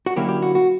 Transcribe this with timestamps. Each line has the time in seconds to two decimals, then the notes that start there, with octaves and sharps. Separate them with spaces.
0.06 F#4
0.16 D3 F#3 A#3 C#4 E4 G4
0.28 G4
0.42 F#4
0.55 F#4